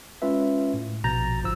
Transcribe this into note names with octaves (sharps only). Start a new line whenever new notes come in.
G#3 C#4 F4 B4 E5
A2
A#1 B2 A#5 G6 A6
G1 G#2 F3 E6